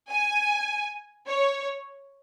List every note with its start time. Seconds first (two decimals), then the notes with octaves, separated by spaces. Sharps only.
0.10 G#5
1.28 C#5